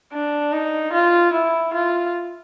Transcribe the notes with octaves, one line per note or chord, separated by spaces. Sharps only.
D4
D#4
F4
E4
F4